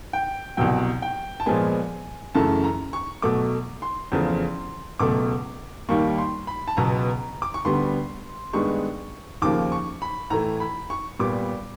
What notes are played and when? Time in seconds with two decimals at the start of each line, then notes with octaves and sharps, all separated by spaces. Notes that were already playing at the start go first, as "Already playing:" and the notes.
0.13 G5
0.57 C2 B2 F#3 G5
1.02 G5
1.40 A5
1.46 A#2 F3 G#3 B3 G#5
2.35 F#2 C#3 E3 A3 A5
2.64 A#5
2.93 C#6
3.22 B2 F#3 A3 D6
3.82 C6
4.12 E2 C#3 F3 A3
4.99 C#2 B2 F#3 A3 D6
5.89 D#2 D#3 G3 A#3 C#6
6.18 C6
6.47 B5
6.68 A5
6.77 C#2 B2 F#3 B3 A#5
7.42 D6
7.54 C#6
7.65 D2 D3 G3 B3 C6
8.53 G2 D#3 G#3 B3 C#6
9.42 D#2 C#3 F3 A#3 D6
9.72 C#6
10.02 B5
10.30 A2 E3 A3 A#5
10.60 B5
10.90 C#6
11.19 A#2 G3 B3 D6